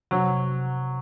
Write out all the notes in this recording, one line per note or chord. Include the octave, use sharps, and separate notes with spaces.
C3 F#3